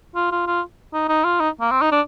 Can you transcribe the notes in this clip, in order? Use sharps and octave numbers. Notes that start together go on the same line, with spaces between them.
F4
F4
F4
D#4
D#4
F4
D#4
A#3
C4
D#4
D4